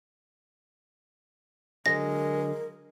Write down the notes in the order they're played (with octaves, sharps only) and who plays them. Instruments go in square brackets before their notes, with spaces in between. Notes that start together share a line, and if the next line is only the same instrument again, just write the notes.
[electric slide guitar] D3 F#3 D4 [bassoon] G#3 [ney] A#4 [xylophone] A#6